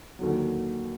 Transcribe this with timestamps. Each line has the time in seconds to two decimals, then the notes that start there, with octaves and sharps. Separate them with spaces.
0.19 D#2 D3 F#3